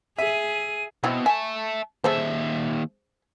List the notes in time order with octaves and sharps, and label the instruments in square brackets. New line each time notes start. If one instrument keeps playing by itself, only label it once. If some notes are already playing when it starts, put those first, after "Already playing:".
[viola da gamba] G#4 [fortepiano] E5 [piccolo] D#7
[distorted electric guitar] B2 [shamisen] C4 E4
[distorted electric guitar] E5 A5 [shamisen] G#5
[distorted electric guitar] D#2 E5 [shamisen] G#4 A4 C5